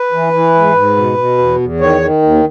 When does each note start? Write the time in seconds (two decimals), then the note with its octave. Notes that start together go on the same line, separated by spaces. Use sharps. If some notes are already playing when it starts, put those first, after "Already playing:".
Already playing: B4
0.12 E3
0.33 E3
0.55 G#2
0.75 G#2
0.96 B2
1.17 B2
1.38 E2
1.59 E2
1.80 D#3 C#5
2.01 D#3
2.22 D#2